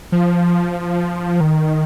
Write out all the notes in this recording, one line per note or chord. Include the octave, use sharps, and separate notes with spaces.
F3
D#3